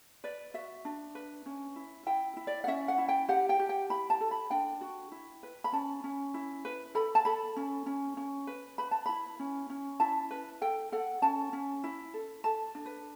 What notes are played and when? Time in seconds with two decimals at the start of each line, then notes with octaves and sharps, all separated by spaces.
0.24 B4 D5
0.54 F#4 E5
0.85 D4
1.15 B4
1.46 C#4
1.76 E4
2.06 E4 G5
2.37 E4
2.47 D5
2.64 F#5
2.67 C#4 E5
2.88 F#5
2.98 E4
3.08 G5
3.29 G4 F#5
3.49 G5
3.59 G4
3.69 G5
3.90 E4 B5
4.10 A5
4.21 A4
4.31 B5
4.50 D4 G5
4.81 F#4
5.12 E4
5.43 B4
5.64 B5
5.73 C#4 A5
6.04 C#4
6.34 E4
6.65 B4
6.95 A4 B5
7.15 A5
7.25 A4 B5
7.56 C#4
7.86 C#4
8.17 C#4
8.47 B4
8.78 B4 B5
8.91 A5
9.06 E4 B5
9.40 C#4
9.70 C#4
10.00 E4 A5
10.31 B4
10.61 A4 G5
10.92 A4 F#5
11.22 C#4 A5
11.53 C#4
11.84 E4
12.14 A4
12.44 A4 A5
12.75 D4
12.86 B4